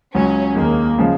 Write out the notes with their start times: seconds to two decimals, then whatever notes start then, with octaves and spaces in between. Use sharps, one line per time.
0.14 C#2 C#3 F#3 C#4
0.56 D#2 D#3 G#3 A#3
0.98 C#3 F3 G#3